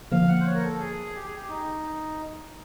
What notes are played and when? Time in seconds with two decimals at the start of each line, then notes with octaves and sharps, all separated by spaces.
0.11 D3 F3 A#3 F5
0.28 F#5
0.40 C5
0.46 C#5
0.54 A#4
0.63 A4
0.80 G#4
1.16 G4
1.26 G#4
1.37 G4
1.49 D#4